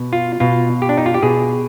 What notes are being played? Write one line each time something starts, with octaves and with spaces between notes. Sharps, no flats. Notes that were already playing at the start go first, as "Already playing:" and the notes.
Already playing: B2
F4
B2 F4
G4
D4
D#4
F4
G4
B2 G#4